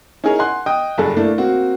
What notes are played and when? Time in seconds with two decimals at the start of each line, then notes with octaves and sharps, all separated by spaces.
0.24 C#4 D#4 E4 G#4 A#4 C#5
0.39 F#5 G#5 C6 F#6
0.66 D#5 G5 D#6
0.98 F#1 G2 G#4 A4
1.17 A3 A#3 D4 E4
1.38 A#3 C4 F#4